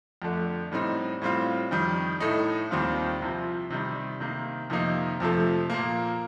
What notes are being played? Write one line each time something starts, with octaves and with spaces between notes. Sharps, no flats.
F2 D3 A3 D4
A2 G3 C4 D#4
A2 G3 C4 F4
F2 D#3 G3
A2 A3 D#4
D#2 D#3 G3 C4 F4
C2 C3 F3
C3 D#3 G3
C3 D#3 A#3
F2 C3 D#3 A#3 D#4
F2 C3 F3 A3
A#2 F3 A#3